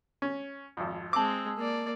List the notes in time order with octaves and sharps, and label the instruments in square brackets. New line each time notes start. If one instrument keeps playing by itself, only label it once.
[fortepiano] C#4
G#1 F2
[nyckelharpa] G#3 C4 [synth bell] A5 E6 [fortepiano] D6
[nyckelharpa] A#3 D5